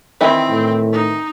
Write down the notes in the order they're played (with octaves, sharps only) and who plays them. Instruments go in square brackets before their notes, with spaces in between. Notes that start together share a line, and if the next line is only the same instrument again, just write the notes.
[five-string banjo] D#3 E3 E4 [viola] C4
[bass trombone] A2
[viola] D#4